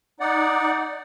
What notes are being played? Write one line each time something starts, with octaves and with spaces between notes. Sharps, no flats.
D#4 D5 F#5